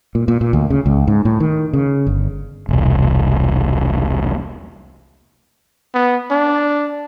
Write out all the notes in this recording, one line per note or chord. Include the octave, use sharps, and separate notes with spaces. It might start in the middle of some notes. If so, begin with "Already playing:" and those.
A#2
A#2
A#2
D2
C#3
C#2
G#2
A2
D#3
C#3
G1
E1 C2
B3
D4